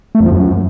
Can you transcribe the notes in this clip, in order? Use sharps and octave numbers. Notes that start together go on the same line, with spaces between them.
A3
F2
F3
F#2